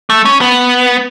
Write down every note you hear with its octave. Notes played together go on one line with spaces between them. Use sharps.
A3
C#4
B3